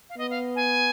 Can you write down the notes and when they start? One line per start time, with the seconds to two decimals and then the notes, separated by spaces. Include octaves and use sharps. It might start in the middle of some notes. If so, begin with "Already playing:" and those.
0.09 F5
0.17 B3 D#5
0.30 F5
0.56 G#5